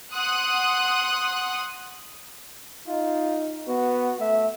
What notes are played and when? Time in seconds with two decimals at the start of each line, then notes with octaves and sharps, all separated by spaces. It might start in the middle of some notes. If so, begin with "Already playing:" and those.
0.13 F#5 C6 D#6 F#6
2.88 D#4 F4
3.68 B3 F#4
4.20 A3 E5